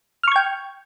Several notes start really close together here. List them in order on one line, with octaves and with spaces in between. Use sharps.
F6 C#6 G#6 G5